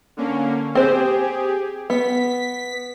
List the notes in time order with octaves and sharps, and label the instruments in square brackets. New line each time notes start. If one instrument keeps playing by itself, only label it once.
[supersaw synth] D3 A#3 C#4
[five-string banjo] C4 C5 [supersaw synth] G4 G#4
[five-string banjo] B3 [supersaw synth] B6